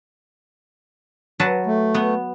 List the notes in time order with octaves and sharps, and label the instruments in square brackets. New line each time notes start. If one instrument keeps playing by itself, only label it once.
[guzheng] F#3 B4 A5
[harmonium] A3
[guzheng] B3